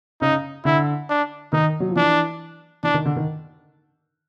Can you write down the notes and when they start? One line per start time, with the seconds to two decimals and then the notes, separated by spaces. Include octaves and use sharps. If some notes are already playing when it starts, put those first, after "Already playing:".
0.21 C#3 D#4
0.65 D3 E4
1.09 D4
1.53 D#3 D#4
1.80 F#3
1.89 F3
1.96 E3 D4
2.83 E3 D4
2.94 D#3
3.05 D3
3.16 D#3